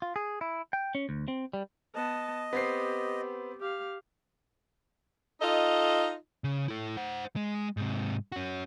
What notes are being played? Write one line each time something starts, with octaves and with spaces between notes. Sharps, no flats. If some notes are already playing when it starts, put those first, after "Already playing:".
F4
G#4
E4
G5
C#4
D2
C4
G3
B3 D#5 A5
B3 C4 G4 C7
G4 F5
D#4 F4 A4 D#5
C#3
E4 A4
C5 F#5
G#3
G#2 C3
C#4 F#4